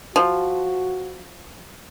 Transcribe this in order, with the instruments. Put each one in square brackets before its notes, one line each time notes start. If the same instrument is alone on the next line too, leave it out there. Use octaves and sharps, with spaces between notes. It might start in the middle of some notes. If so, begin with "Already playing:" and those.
[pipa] F3 [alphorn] F#4